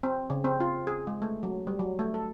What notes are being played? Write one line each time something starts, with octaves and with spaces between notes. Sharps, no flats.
C4
C#3
C4
F4
G#4
G#3
A3
F#3
G3
F#3
A3
A4